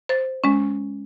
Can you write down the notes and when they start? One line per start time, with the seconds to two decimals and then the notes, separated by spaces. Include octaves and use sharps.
0.09 C5 A6
0.44 G#3 C#4